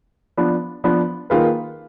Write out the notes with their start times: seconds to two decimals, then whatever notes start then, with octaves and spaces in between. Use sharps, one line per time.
0.37 F3 B3 D4
0.84 F3 B3 D4
1.30 D#3 A#3 F4 G#4 B4